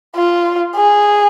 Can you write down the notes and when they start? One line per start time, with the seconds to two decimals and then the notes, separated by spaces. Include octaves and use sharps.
0.16 F4
0.76 G#4